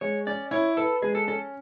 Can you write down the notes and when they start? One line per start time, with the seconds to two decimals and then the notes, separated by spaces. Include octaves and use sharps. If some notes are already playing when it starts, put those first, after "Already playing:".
0.01 G#3 C#5
0.27 C#4 D5
0.51 E4 C#5
0.77 A4 B4
1.02 G#3 G#4
1.15 A4
1.28 C#4 A4